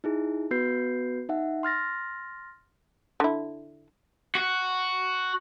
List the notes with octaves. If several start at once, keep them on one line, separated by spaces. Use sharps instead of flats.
D#4 E4 G#4
B3 F#4 B4 G6 C7
D#4 E5 F#5
C6 F6 A6 A#6
D3 E4
F#4